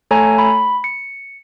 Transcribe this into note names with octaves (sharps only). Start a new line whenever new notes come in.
A3 A4 C#5 G#5 A#5
B5
C#7